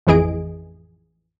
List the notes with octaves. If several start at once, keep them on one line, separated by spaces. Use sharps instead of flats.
A1 F2 E3 G#4 D#5 D7